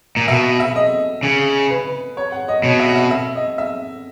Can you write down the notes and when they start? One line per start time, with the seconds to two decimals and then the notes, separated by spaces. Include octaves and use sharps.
0.17 A#2
0.28 B2 E5
0.60 E5
0.76 D#5
1.23 C#3
1.70 B4
2.17 C#5
2.32 F#5
2.48 D#5
2.64 B2 C#5
2.80 E5
2.89 F#5
2.96 E5
3.11 E5
3.35 D#5
3.58 E5